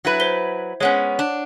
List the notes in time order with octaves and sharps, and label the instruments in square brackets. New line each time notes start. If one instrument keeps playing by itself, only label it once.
[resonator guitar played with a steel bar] F#3 E4 B4
[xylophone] C5 B6 G7
[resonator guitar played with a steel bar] G#3 B3 C#4 [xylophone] C#5 F#5
[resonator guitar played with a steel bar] D4